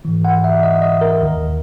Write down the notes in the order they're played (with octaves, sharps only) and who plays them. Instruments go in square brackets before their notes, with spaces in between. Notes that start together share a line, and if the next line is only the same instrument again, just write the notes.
[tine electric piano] G#2 E3
F#5
E5
D#5
D#5
A#4
D#2 D#3